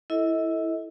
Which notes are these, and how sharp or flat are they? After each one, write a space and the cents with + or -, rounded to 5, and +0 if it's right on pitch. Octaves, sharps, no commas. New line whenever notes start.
E4 +0 A4 +0 D#5 +40